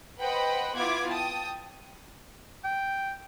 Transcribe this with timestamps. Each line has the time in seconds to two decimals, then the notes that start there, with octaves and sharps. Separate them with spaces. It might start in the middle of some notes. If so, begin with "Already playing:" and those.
0.20 B4 C5 D#5 F#5 G5 B5
0.75 B3 E4 F4 D6 G#6
1.10 G5 A5 D#6
2.64 G5